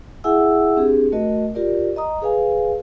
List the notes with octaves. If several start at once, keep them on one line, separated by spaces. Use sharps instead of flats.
E4 G#4 E5 F#5 G#5 E6
C4 D4 G4 G#4
A3 F#4 A#4 D#5
F4 G4 A#4 D5
D#5 A#5 D#6
G#4 B4 F5 G#5